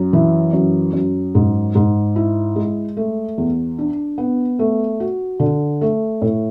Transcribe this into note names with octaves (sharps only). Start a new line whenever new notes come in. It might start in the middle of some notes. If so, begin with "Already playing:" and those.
Already playing: F#2
E3
F#2
F#2
G#2
G#2
E4
G#3
A3
E2
D4
B3
A3
F#4
D3
A3
A2